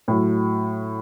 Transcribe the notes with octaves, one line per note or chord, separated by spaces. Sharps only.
A2 F#3